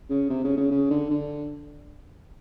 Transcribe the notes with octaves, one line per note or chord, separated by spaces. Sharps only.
C#3
C3
C#3
C#3
C#3
D3
D3